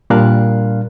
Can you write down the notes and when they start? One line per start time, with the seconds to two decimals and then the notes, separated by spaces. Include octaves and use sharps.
0.10 A#2 G3 D4 A#4 F5 F#6